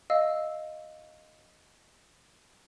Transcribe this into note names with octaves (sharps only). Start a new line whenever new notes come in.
D#5 F5 E6